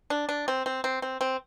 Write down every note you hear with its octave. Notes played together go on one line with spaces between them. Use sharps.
D4
D4
C4
C4
C4
C4
C4